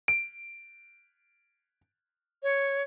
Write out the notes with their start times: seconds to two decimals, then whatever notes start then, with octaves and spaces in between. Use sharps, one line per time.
0.08 D7
2.43 C#5